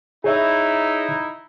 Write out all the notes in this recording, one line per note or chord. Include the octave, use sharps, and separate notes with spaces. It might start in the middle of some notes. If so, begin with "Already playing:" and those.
D#4 E4 G#4 C#5 E5